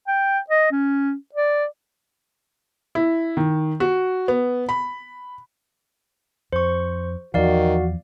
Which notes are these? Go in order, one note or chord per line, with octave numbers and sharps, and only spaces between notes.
G5
D#5
C#4
D5
E4
D#3
F#4
B3
B5
F2 C5 C#6
E2 D#3 F3 F#4 D5 F5